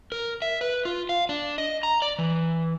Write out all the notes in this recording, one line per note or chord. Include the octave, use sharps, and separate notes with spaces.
A#4
E5
B4
F4
F5
D4
D#5
A#5
D5
E3